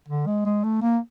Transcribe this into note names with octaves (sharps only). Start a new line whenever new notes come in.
D3
G#3
G#3
A3
A#3